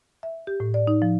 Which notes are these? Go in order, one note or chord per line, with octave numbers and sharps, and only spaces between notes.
E5
G4
A2
D5
D#4
F3